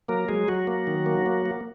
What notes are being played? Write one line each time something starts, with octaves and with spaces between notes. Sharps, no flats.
F#3 A#3 A#4
F#3 G#3 G#4
F#3 F#4
A#3
D#3
A#3
A#3
A#3